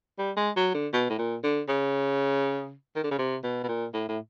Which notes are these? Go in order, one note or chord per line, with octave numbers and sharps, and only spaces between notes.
G3
G#3
F#3
D3
B2
A2
A#2
D3
C#3
D#3
D3
C#3
C3
B2
B2
A#2
A2
A2